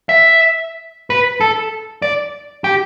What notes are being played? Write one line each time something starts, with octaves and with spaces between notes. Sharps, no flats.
E5
B4
A4
D5
G4